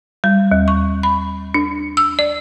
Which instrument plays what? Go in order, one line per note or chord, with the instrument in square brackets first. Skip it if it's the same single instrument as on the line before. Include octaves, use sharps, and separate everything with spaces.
[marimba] G3
D#2
C#6
B5
D4
E6
D5